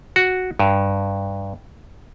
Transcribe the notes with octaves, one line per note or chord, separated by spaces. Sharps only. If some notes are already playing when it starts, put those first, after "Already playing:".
F#4
G2